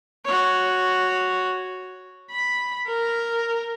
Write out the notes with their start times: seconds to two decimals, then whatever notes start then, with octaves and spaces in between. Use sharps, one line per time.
0.25 F#4 C#5
2.31 B5
2.87 A#4